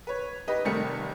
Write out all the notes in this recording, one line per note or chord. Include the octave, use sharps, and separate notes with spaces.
B4 C#5
D#4 G4 B4 D#5
F1 C3 D#3 G3 A3 C#7